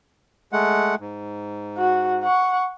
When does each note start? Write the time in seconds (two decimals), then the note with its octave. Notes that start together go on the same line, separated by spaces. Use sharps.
0.53 G#3 A3 F#5
1.00 G#2
1.78 F#4
2.23 F#5 C#6